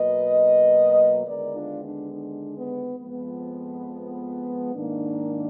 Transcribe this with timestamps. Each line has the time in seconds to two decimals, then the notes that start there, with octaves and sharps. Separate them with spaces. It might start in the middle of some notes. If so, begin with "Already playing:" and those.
Already playing: B2 F#3 A#3 B4 D#5
1.25 D#2 D3 G#3 B3 A#4 D5
1.54 D4 F4
1.84 D4
2.13 D4
2.56 B3
3.00 F2 F3 G#3 B3
4.75 G#2 D#3 A#3 D4